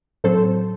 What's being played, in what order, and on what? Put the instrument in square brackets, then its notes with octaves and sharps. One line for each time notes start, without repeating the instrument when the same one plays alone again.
[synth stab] A2 F#3 C4 A4 C5